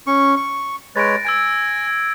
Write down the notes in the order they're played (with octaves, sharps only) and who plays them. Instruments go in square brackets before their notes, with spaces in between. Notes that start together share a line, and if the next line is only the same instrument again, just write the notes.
[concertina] C#4 C#6
C#6
[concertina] G#3 B4 C#5 [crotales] A6 A#6 D7
[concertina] G#5 [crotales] E6 G#6 D7